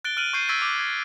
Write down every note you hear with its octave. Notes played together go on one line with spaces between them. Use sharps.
F#6 A6 D7 G7
F6 F#6 D7 D#7 F#7
C#6 G6 C7 D#7
C#6 E6 G#6 A6 B6 D7
D6
G#6